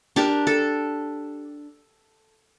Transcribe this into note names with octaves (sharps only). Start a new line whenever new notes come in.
D4 G4 A#4
A4